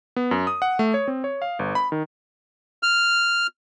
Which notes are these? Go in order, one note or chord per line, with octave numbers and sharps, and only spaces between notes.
B3
F#2
D#6
F#5
A3
C#5
C4
C#5
F5
G1
B5
D#3
F6